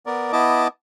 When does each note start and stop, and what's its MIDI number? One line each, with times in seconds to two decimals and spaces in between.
0.06 0.32 59
0.06 0.32 70
0.06 0.32 74
0.32 0.68 59
0.32 0.68 64
0.32 0.68 75
0.32 0.68 81
0.32 0.68 86